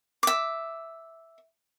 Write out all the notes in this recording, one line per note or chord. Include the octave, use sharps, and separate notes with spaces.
E5 D6